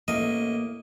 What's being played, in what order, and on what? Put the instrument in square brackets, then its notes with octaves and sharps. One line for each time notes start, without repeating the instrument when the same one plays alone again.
[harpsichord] A1 D#5 [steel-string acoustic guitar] A#3